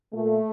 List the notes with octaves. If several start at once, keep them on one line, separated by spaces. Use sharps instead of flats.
A#2 A3